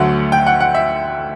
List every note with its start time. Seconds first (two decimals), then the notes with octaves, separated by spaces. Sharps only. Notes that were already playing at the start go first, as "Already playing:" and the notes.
Already playing: D2 D3 F#3 A3 F#5
0.32 G5
0.47 F#5
0.60 F#5
0.75 E5